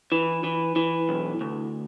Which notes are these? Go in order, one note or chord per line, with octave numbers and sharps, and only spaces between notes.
E3
E3
E3
B1
D2